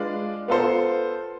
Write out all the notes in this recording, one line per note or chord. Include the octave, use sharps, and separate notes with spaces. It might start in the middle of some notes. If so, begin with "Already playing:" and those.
Already playing: G#3 D4 F4 B4 D5
B3 F4 A4 C5